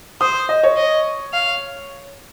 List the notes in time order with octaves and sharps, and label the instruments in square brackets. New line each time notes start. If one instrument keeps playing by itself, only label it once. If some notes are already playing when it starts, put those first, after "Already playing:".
[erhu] C5 [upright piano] D#6
[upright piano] D#5
C#5
[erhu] D#5
F5